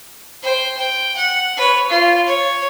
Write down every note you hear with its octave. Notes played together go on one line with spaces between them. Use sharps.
C5 G5
G5
F#5
B4 C#5
F4
C#5